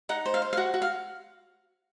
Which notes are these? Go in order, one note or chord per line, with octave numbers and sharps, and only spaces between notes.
D#4 F#5
C5
F5
C5
F5
F#4 F#5
F#4
F5